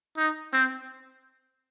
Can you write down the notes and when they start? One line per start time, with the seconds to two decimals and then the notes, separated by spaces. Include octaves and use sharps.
0.17 D#4
0.53 C4